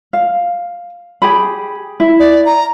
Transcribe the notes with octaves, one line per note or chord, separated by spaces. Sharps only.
F5
G4 G#4 B5
E4
D5
A#5